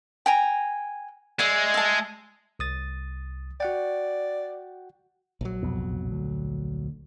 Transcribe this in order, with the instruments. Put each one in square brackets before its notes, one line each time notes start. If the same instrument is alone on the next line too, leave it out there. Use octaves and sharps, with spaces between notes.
[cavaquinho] G5 G#5 A#5
[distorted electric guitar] G#3 [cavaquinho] D5 E5
[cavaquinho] E5 A5
[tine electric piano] C2 D#6 A6
[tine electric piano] F#4 F#5 G5 [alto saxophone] D5
[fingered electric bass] A#1 F#3
[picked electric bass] C2 F2 B2
D2